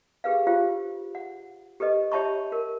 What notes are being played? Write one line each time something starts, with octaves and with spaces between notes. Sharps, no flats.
G4 G#4 B4 F5
F4 G4 C5 F5
F#5
G4 A4 B4 D#5
G4 C#5 E5 A5 B5 C#6
A#4